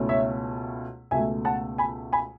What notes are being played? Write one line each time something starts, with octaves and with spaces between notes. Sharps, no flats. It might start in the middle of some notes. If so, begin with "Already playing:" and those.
Already playing: C#2 B2 A3 C#4 E4
C#5 E5
C#2 B2 A3 E5 G#5
F#5 A5
G#5 B5
G#5 B5